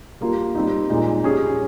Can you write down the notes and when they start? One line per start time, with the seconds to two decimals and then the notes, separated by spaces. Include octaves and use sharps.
0.21 G3 A#3 F4
0.55 G3 C4 D#4
0.90 A#2 G#3 D#4
1.24 G3 C#4 G#4